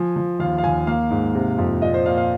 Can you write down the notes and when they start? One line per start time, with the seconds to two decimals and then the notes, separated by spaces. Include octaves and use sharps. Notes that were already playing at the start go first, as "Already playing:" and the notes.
Already playing: F3 G#5
0.16 F3
0.39 D#2 F5
0.58 F5
0.64 D#2 G#5
0.87 A#3 F5
1.11 G#2
1.35 C3
1.58 F2
1.82 A#2 D#5
1.94 C5
2.06 A#2 F5
2.18 F5